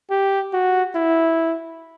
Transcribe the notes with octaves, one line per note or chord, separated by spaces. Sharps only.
G4
F#4
E4